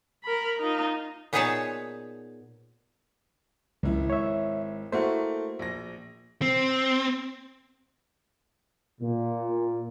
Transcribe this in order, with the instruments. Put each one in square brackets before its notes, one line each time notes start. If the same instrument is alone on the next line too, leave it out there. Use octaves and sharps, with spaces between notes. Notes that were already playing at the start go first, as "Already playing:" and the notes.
[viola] A#4 B5
D#4 F4
[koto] A#2 B3 D#4 G#4 C#5 A5
[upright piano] G#1 E4 [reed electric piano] C#2
[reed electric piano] C#5 E5
[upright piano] A3 A#3 E4 [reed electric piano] F#4 C5
[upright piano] A#1 A#6
[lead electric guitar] C4
[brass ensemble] A#2